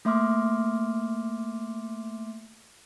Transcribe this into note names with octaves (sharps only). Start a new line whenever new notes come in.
A3 A#3 E5 C6 D6 F6